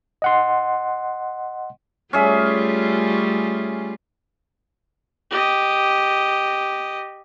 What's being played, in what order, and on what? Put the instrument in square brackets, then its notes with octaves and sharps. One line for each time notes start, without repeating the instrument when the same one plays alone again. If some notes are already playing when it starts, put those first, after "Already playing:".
[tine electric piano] D#5 F#5 C6
[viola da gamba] G3 A3 F4 [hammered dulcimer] C#4 G#4 E5
[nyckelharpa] G4 D#5